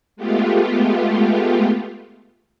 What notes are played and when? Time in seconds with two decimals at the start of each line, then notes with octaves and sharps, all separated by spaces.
0.16 G#3 A3 B3 F4 G4